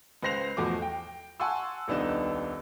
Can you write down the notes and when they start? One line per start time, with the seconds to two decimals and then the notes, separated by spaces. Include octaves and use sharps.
0.23 C#2 B4 C5 A#6 C7 F7
0.57 E2 B2 F3 A3 F#4 D6
0.82 G5
1.40 F#5 G#5 A5 C6 C#6 E6
1.88 D#1 C2 B3 D4 D#4 E7